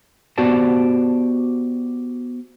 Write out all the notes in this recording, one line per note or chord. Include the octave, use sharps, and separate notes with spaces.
B3 F#4 G4 C5 D5 A5